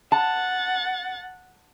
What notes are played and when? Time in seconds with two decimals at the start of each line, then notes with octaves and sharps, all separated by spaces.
0.12 F#5 A5 A6